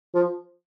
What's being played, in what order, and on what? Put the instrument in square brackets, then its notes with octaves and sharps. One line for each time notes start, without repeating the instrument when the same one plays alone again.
[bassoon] F3